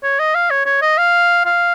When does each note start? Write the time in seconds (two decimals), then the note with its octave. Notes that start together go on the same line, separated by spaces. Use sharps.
0.03 C#5
0.20 D#5
0.35 F5
0.50 C#5
0.66 C#5
0.82 D#5
0.98 F5
1.46 F5